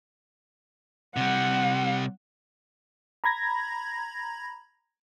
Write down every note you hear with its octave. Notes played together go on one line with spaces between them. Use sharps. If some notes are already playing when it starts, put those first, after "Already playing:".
C3 G3 F#5
A#5 B5 G#6 A#6